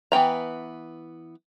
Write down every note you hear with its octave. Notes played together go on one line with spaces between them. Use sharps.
E3 B3 G5 A#5